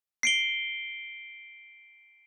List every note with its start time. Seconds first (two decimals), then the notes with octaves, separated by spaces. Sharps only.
0.23 C7 D7 G7